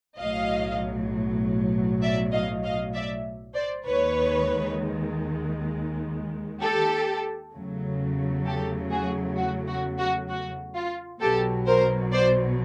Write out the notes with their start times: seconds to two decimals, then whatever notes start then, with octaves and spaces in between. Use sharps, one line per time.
0.18 B1 A2 F#3 D#5 F5
2.02 D5 E5
2.33 D#5 F5
2.64 D#5 F5
2.94 D5 E5
3.55 C5 D5
3.86 D#2 D#3 G#3 B4 C#5
6.61 G4 A4
7.53 E2 C#3 F#3 A3
8.45 G4 A4
8.91 F#4 G#4
9.37 F#4
9.68 F#4
9.98 F#4
10.29 F#4
10.75 F4
11.21 B1 B2 F#3 G4 A4
11.66 A#4 C5
12.12 C5 D5